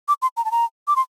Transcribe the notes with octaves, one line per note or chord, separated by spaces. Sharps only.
D6
C6
A#5
A5
A#5
D6
C6